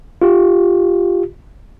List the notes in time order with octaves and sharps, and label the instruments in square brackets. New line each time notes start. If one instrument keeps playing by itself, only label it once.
[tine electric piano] F4 G4